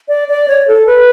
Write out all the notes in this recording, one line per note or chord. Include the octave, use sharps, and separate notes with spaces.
D5
D5
C#5
A4
B4